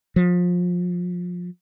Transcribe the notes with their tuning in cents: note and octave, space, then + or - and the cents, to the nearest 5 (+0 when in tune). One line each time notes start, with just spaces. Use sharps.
F3 +25